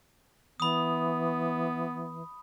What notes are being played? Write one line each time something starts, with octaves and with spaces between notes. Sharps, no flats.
E3 B3 B5 D#6